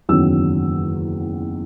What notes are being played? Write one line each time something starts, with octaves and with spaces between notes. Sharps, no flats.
F#1 E2 D#3 F#3 C#4 E6